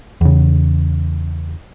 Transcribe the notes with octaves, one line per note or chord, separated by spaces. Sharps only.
E2 C#3